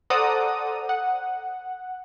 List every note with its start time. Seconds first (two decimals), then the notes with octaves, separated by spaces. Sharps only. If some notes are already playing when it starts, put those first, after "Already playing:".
0.10 A4 C5 D5 F#5 A#5 D#6
0.89 F#5